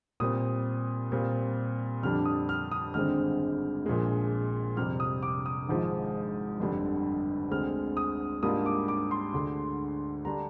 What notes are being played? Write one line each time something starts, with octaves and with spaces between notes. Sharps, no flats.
A#2 G3 C4 D#6
A#2 G3 C4 F4
F2 D3 G3 D4 F6
D#6
F6
D#6
G#1 G2 D3 G#3 C4 F6
A#1 A#2 F3 G#3
F2 C3 G3 F6
D#6
D6
D#6
G#1 G#2 F3 G#3
G1 F2 D3 G3
D2 D3 G#3 C4 F6
D#6
G#2 G3 A#3 D4 F4 D#6
D6
D6
C6
D2 D3 G#3
D3 G3 D4 A#5